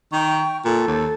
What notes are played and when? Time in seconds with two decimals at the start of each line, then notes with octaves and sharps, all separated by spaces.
0.13 D#3 G5 C#6
0.65 A#2 A4
0.87 D#2